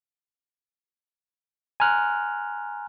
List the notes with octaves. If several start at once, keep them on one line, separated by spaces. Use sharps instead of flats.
G#5 A#5 C6 F6 F#6